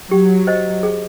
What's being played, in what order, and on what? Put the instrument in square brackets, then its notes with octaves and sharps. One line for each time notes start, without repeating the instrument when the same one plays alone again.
[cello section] F#3 [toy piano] G4
[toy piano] C5 D#5
G#4